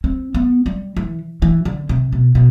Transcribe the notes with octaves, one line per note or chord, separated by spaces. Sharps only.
C4
B3
G3
E3
E3
D3
C3
B2
B2